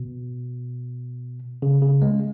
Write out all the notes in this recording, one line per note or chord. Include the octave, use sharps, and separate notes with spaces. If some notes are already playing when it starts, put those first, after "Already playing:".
Already playing: B2
C#3
C#3
G#3